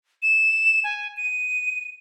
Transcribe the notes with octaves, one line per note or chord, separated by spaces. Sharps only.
E7
G#5
D#7